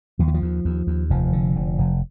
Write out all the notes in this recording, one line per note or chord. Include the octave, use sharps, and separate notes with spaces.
D#2 F3
E3
F3
D#2
D#2
D#2
F1 F3
D3
F1
F1